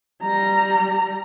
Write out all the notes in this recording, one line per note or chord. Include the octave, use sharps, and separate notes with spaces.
G3 A#5